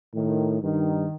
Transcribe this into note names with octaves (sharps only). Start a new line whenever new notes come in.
A2 D#3
G2 D#3